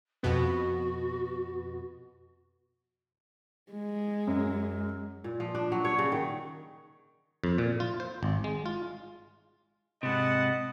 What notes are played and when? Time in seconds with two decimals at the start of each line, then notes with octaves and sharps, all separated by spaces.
0.23 F2 B2 B3 F#4
3.72 G#3
4.27 F#2
5.24 A#2
5.40 F3
5.55 D4
5.72 F#3
5.85 C#5
5.98 C#3
6.12 D#3
7.44 F2
7.58 A#2
7.80 F4
8.00 C5
8.23 G#1
8.44 G#3
8.66 F4
10.03 G#2 C3 B4 D#5 F#5 A5